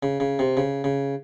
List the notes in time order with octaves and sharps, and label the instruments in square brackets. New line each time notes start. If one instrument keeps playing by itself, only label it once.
[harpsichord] C#3
C#3
C3
C#3
C#3